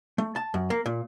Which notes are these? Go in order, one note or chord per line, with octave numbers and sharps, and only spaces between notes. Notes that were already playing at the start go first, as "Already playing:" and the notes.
A3
A5
F#2
A#3
A#2